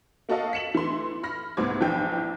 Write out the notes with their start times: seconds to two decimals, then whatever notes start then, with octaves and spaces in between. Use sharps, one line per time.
0.29 A#3 F#4 A4 D#5 F5
0.53 B6 C#7 E7 F#7
0.75 E3 A3 C6
1.23 B5 F6 A#6
1.57 C2 G#2 B3 C5 D6 G#6
1.81 A#1 E3 G5 G6